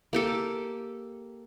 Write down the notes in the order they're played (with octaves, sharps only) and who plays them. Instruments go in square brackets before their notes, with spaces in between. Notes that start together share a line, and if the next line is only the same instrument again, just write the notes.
[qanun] A#3 G4 A4